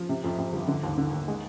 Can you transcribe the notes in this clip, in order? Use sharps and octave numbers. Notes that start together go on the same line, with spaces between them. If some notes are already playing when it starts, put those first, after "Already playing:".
Already playing: F3
C3
F2
F2
G1
D3
D#2
D3
D#2
G#3